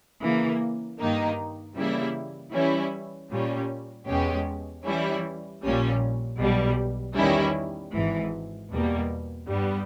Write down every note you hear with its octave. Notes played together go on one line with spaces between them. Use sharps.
C#3 E3 A#3
G2 D#3 A#3 D#4
C#3 E3 G3 A#3 E4
E3 G3 C#4 E4
A#2 G3 C#4
E2 B2 G#3 C#4 G4
E3 G3 C#4 E4
A#1 A#2 G3 C#4
B1 B2 G3
E2 D#3 G3 C#4 E4
G#1 G#2 E3
E2 B2 G3 A#3
G2 G3 B3